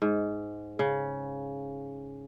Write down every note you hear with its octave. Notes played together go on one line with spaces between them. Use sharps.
G#2
C#3